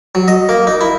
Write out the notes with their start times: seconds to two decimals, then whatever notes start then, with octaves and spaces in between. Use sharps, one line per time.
0.15 F#3
0.28 D#5
0.49 A#3
0.67 D#4
0.81 E4